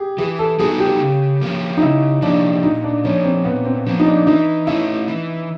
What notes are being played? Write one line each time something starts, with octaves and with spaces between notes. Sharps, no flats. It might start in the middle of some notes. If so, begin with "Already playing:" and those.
Already playing: G4 G#4
E3 G#4
A4
G3 B3 D#4 F#4 G#4
G4
C#3
F3 A#3 C#4
D#4
C#3 E4
F3 A#3 C#4 D4
A#2 D#4
D4
F3 A#3 C#4
C4
A#2 B3
C4
F3 A#3 C4
D#4
D4
E3 D#4
A3 C#4 E4
E3